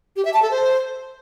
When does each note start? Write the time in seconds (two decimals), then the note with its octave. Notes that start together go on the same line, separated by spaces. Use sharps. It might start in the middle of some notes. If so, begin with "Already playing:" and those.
0.16 G4
0.25 E5
0.34 A5
0.42 A4
0.51 C5